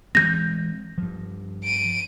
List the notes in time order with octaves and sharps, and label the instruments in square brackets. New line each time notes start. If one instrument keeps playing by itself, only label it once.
[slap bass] E3 G#3 C4 [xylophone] G6 A#6
[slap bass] G2 F3
[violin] D7 D#7